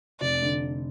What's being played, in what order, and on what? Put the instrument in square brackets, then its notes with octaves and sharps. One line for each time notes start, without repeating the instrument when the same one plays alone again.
[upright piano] F1 [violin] D5
[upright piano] D3